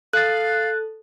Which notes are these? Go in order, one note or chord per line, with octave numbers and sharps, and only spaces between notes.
A4 F5 F#6 A6